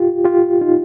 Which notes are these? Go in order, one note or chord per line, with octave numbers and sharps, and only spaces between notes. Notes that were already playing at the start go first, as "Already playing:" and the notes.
Already playing: F4 G4
F4 G4
D#4 F4